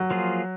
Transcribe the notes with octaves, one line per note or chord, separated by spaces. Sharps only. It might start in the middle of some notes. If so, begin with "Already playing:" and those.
Already playing: F#3
F3 A#3 F4 G#4